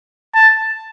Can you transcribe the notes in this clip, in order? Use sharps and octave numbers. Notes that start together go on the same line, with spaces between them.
A5